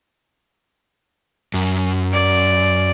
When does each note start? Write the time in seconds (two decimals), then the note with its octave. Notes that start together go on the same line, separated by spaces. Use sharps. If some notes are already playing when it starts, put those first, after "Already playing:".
1.54 F#2
2.13 D5